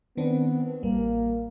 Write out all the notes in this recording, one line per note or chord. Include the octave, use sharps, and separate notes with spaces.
D#3 B3 C4 D4
A1 G3 A#3